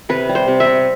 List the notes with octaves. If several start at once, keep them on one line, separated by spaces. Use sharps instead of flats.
C3 B4
G3
C5
C3
E5
C3